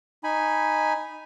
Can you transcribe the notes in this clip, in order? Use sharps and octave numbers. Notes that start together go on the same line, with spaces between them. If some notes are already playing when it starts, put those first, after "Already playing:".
D#4 G#5 B5